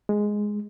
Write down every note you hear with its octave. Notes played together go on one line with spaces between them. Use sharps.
G#3